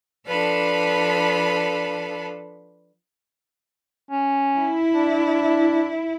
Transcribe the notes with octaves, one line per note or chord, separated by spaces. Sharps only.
F3 D4 A4 B4 F5 B5
C#4
E4
D4